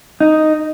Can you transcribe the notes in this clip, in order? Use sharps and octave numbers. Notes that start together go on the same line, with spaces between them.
D#4